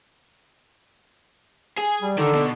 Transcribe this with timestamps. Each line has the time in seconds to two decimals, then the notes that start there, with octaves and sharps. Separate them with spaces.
1.77 G#4
2.02 G3
2.18 D3 D#3
2.34 B2